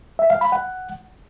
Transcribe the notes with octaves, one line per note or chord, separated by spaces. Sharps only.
E5
F5
B5
F#5